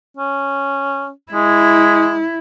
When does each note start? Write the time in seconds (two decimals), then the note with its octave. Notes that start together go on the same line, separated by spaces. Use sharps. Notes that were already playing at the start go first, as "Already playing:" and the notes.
0.17 C#4
1.32 G#3 E4